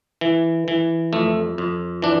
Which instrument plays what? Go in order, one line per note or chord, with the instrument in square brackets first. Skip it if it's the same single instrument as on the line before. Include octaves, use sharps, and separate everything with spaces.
[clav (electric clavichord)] E3
E3
F2 A3
F2
E3 D4